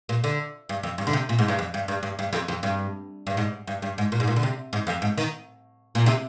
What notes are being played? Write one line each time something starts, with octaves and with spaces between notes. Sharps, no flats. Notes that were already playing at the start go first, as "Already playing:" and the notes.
A#2
D3
G2
F2
G2
D3
C3
A#2
G#2
G2
F2
G2
G2
G2
G2
F2
F2
G2
G2
G#2
G2
G2
G#2
A#2
G#2
A#2
D3
C3
G#2
F2
G#2
D#3
A#2
C3